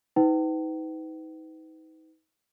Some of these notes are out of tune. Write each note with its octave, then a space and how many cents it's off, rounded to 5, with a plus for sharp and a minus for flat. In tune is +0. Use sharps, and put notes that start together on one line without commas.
D#4 +35 B4 +35 G5 -40